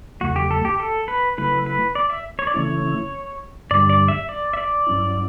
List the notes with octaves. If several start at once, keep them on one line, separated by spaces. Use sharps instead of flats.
E2 C#3 F#3 A3 F#4
G4
A4
G4
A4
B4
C#3 F#3 A3 E4 B4
B4
D5
E5
C#5
D5
C#3 E3 A3 C#4 E4 C#5
G2 D3 G3 D5
D5
E5
D5
E5
D5
G2 F#3 C#4 E4